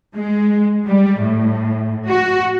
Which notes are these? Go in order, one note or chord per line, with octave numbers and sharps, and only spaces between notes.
G#3
G3
A2
F#4